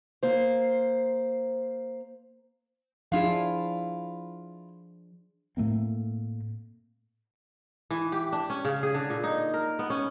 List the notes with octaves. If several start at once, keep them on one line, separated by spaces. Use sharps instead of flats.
A#3 C5
F3 D4 E4 F4 G#4 F5
A2 A3 A#3 C4
E3
G4
D4
C#4
C#3
G#4
D3
A#2
D#4
A#4
B3
C#4